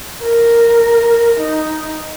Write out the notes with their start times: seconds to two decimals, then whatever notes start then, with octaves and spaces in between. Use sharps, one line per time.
0.23 A#4
1.40 D#4